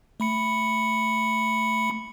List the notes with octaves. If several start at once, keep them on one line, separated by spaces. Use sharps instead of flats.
A3 B5 C#7